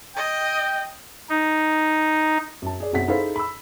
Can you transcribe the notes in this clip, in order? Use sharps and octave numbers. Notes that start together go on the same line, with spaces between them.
D#5 G5
D#4
F#2 A5
G#4 D5
B1 F#2 F#3 C4 F#5 B6
D#4 E4 G#4 A4 C5 F5
B5 E6